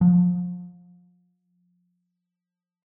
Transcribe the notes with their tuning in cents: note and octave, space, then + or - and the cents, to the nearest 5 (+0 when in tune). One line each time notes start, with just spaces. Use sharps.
F3 +30